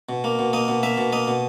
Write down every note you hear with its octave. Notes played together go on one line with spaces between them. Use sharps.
B2
A#3
B2
A#3 D#5
B2
A#3 E5
B2
A#3 D#5
B2